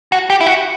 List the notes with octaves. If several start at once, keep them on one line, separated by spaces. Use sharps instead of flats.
F#4
G4
E4
F#4